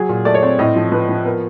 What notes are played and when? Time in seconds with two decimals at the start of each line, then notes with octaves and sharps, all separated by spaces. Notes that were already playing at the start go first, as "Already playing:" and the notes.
Already playing: F#3 G#4
0.09 A#2
0.25 A3 D5
0.34 C#5
0.42 C4 D5
0.59 A2 D#5
0.76 F3
0.92 F3 B4
1.09 F3
1.25 B3 A#4